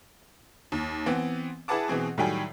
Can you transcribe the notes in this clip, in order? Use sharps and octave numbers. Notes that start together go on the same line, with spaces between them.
D#2
E3 B3 C4
E4 G#4 B4 F#5 A5 D6
B2 E3 C4 G#4
A2 D#3 F#3 G3 G5 G#5